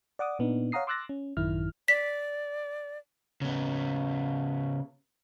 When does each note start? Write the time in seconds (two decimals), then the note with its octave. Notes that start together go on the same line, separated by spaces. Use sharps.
0.19 D5 F#5 D6 D#6
0.39 A#2 B3 D4 D#4
0.72 C#5 F5 F#5 A#5 D#6 C7
0.87 C6 D6 E6 F#6 A6 A#6
1.09 C#4
1.37 A1 F#2 D#3 E4 F6
1.88 D5 B6
3.42 C#3 B3